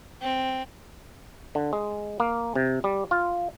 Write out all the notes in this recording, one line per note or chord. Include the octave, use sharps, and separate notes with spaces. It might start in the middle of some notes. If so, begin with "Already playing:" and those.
C4
D3
G#3
A#3
C3
G3
F4